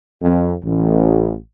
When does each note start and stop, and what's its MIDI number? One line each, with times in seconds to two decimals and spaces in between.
0.22 0.53 41
0.64 1.33 33